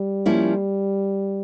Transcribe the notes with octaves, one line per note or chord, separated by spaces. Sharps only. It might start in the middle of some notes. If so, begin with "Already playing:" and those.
Already playing: G3
F3 A#3 C#4 E4